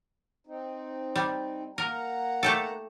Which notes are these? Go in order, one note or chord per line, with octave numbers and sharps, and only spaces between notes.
C4 D#4
G3
A#3 A#4 F#5 A#5
A3 G4 A4